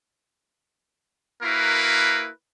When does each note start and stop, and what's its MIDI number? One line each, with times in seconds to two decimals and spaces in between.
1.43 2.30 58
1.43 2.30 64
1.43 2.30 66
1.43 2.30 70
1.43 2.30 71